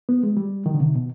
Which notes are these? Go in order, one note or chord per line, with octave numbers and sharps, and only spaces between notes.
B3
G#3
G3
D#3
D3
C3
B2